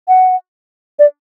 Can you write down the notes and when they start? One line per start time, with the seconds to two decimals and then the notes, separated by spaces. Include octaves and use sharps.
0.08 F#5
0.99 D5